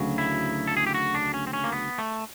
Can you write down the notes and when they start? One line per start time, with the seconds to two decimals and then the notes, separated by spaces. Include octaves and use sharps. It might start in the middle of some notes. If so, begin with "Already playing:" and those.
Already playing: D2 C#3 F#3
0.18 E4
0.68 A4
0.77 G#4
0.87 G4
0.94 F#4
1.15 D4
1.34 C#4
1.47 C4
1.53 C#4
1.64 A#3
1.72 B3
1.98 A3